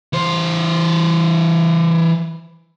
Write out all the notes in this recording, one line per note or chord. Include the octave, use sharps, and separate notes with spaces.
E3 C5